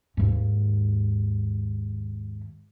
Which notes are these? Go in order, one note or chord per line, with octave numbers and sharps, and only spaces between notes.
D#2 G#2